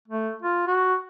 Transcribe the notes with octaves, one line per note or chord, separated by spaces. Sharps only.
A3
F4
F#4